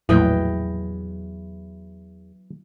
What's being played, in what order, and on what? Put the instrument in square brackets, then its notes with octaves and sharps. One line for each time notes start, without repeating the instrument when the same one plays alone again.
[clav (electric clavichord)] A#1 A2 [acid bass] E2 [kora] E3 D#5 G5 [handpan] F#3 B3